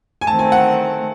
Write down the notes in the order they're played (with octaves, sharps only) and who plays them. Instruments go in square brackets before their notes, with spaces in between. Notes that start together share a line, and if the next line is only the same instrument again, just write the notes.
[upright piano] G#5
[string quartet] D#3 A3 C4 [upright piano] A5
[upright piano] G#5
F#5